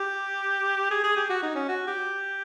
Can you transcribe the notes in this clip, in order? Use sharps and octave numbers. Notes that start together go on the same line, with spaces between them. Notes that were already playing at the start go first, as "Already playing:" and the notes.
Already playing: G4
G#4
G#4
G4
F#4
D#4
C#4
F#4
G4